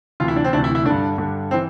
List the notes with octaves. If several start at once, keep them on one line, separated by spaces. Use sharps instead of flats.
D2 C3 E3 F4
E4
D4
C4
D2 C3 E3 D4
E4
E4
G2 D3 D4
G2 D3
C4
E3